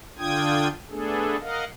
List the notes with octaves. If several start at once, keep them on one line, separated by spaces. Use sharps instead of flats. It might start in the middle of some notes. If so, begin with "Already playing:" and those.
D3 D4 F4 G5 D#6 G#6
A3 B3 D4 G#4 A4
A#4 D#5 F5 F#5